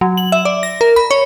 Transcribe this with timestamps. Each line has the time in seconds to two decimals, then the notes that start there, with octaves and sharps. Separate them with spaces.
0.01 F#3
0.17 F#7
0.32 E5
0.45 D5
0.63 A#6
0.81 A#4
0.96 B5
1.11 C#5